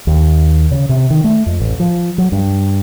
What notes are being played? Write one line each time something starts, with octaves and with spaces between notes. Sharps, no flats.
D#2
C#3
C3
D#3
A3
F2
A1
F3
F#3
G2